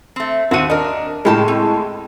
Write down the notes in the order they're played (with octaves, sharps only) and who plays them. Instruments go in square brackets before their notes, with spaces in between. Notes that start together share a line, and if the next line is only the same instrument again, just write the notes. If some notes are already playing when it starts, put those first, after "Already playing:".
[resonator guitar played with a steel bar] A3 C4
[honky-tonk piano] D#2 D#7 [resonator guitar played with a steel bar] C4 F#4
[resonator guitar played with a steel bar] D4 A#4 [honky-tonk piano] D#5
[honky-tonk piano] A2 G#3 [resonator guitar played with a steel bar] C#3 G4 A5
[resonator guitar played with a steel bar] C4